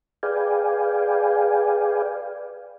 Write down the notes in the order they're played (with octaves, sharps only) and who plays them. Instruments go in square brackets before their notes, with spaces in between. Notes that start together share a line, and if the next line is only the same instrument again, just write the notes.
[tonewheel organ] G#4 B4 D5 F5 G5 G#5